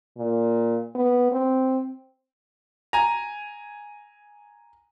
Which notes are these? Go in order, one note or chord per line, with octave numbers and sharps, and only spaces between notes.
A#2
B3
C4
G#5 A#5